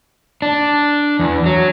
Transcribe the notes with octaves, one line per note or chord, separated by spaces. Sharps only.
D4
E2
F#3